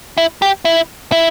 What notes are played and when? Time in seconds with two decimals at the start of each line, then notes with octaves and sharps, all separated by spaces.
0.18 E4
0.42 G4
0.65 E4
1.12 E4